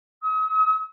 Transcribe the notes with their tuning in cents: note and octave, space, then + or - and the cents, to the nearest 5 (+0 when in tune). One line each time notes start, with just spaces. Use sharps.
D#6 +45